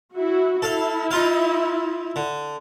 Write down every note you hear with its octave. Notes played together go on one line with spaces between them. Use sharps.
E4 F#4
E4 A4 F5
D#4 F4 F5
D3